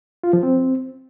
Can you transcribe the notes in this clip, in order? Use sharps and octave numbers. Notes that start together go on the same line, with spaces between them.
F4
F3
C4